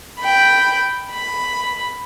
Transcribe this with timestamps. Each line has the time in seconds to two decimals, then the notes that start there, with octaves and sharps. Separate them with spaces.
0.20 G5 B5
1.11 B5